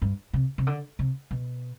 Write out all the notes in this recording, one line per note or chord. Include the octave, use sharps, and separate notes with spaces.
G2
C3
C3
D3
C3
B2